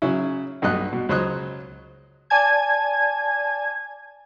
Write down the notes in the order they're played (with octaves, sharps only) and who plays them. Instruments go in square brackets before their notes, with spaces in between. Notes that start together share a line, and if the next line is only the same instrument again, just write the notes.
[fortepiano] C#3 F#3 C#4 E4
B1 G2 D#5 F#6
B2
C#2 F#3 C5 C#5 D#5 F#6
[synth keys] D5 G#5 A5 G#6